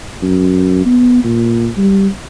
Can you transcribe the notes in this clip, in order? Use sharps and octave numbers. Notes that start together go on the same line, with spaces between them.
F#2
B3
A#2
G3